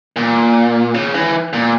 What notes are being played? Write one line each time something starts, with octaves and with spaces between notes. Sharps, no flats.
A#2
C#3
E3
A#2